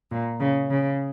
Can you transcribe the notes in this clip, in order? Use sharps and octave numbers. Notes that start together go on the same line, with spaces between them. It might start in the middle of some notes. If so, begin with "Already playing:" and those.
A#2
C#3
C#3